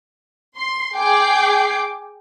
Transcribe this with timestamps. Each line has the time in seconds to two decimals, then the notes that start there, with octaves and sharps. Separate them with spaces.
0.57 C6
0.95 G#4 G5 D6 C7